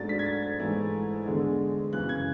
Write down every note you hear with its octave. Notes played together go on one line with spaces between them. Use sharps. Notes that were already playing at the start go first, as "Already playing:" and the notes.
Already playing: G#2 F#3 A3 D4 A6
B6
G#6
A6
G#6
G#2 E3 A3 E4
E2 D3 G#3
F#2 C#3 E3 F#6
G#6